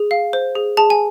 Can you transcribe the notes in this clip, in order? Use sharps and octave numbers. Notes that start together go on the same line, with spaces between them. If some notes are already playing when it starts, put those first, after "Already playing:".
Already playing: G#4
F5
C5
G#4
G#4 A5
G#5